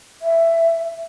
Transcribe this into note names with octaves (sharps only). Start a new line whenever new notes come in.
E5